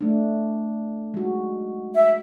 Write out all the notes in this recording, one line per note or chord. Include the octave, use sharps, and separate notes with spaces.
A3 D4
G#3 F#4
E5